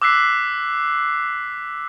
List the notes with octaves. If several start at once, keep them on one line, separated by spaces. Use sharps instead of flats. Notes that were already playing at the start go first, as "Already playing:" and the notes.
D6 E6 F#6 B6 C7